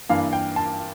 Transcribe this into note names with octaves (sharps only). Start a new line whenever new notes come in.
G2 E3 A#3 D4 F5
G5
A5